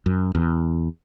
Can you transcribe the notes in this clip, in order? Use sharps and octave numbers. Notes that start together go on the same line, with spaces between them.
F#2
E2